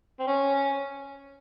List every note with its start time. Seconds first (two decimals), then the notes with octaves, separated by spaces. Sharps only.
0.19 C4
0.27 C#4